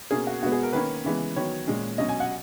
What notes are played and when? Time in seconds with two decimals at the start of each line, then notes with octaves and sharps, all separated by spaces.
0.11 B2 A#3 C#4 G#4
0.27 F#4
0.43 B2 G#3 B3 F#4
0.52 G#4
0.63 A#4
0.73 D#3 A#3 C#4 B4
1.05 C#3 E3 G#3 B3
1.36 D#3 F#3 B3 C#5
1.67 A#2 G#3 C#4
1.98 B2 F#3 C#4 D#5
2.09 G#5
2.20 F#5